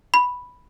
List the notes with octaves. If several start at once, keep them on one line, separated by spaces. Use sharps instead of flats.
B5